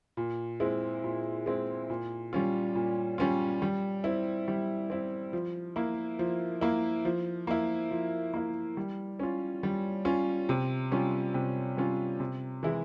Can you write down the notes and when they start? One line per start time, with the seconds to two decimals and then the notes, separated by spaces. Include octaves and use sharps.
0.17 A#2
0.60 G#3 C4 E4
1.04 A#2
1.46 G#3 C4 E4
1.90 A#2
2.33 G3 C#4 F4
2.75 A#2
3.18 G3 C#4 F4
3.62 G3
4.04 C4 E4
4.48 G3
4.90 C4 E4
5.33 F3
5.76 A#3 E4
6.19 F3
6.61 A#3 E4
7.05 F3
7.47 A#3 E4
7.91 F3
8.33 A#3 E4
8.77 G3
9.19 C#4 F4
9.63 G3
10.05 C#4 F4
10.49 C3
10.91 G3 C#4 F4
11.34 C3
11.77 G3 C#4 F4
12.20 C3
12.63 E3 G#3 E4